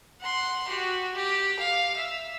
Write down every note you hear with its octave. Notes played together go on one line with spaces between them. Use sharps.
F#5 C6
F#4 G4
G4
F5
E5